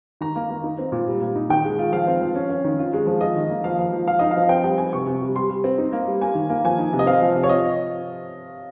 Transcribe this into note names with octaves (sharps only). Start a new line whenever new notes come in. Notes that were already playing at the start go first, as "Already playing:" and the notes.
D#3 A#5
A#3
A#3
D#4
C4
A#2
G3
A#2
D#4
D#3 G5
G#3
F4
F3 F5
C4
F3
C#4
C#4
D#3
F4
G#3
F3
F4 D#5
D#3
A#3
F3 F5
F3
F3
F3 F5
D#4 D#5
F3 F5
C4 G5
G3 G5
G3 G#5
C3 C#6
C3
G3
G3 C6
G3
C4
D#4
A#3
G3
A#3 G#5
D#3
A#3
F3 G#5
D#4
C3
D#5
C4 F5
F3
C3
C#5
F4 D#5